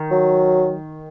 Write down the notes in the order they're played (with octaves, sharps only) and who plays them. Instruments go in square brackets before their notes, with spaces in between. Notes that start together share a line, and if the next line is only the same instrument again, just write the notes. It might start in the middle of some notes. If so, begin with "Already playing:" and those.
Already playing: [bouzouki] D#3
[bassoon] F#3